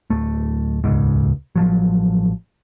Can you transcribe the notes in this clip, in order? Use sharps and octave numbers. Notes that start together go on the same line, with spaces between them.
D1 A3
D#1 G#1 C#2 G#2
A1 F3 F#3